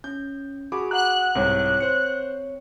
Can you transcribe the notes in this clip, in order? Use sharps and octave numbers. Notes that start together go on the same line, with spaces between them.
C#4 G6
F#4 G#4 B5 D6
F#5 A#5 F#6
C2 G#2 C4 A#4 C#5 G5
C5 C#7